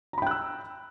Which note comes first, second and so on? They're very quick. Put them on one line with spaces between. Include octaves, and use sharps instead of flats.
A#5 B5 G5 F#6 E6